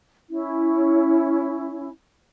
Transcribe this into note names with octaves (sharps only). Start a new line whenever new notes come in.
C#4 E4